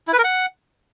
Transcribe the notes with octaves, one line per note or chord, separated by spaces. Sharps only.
E4
B4
A#4
F#5